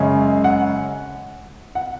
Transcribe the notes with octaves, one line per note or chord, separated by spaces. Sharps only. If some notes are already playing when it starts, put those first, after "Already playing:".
Already playing: F#2 C#3 G#3 C#4
F#5
F#5